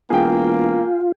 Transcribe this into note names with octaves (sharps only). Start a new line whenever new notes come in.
E1 A#3 F4 G#4 G5